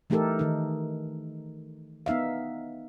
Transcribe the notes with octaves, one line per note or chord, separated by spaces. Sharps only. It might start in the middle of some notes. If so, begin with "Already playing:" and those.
E3 A3 D#4 G4 A4 A#4
D#3 D#4
B3 D#4 E5 F5